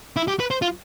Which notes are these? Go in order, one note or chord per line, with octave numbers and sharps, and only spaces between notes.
E4
G4
B4
C5
F4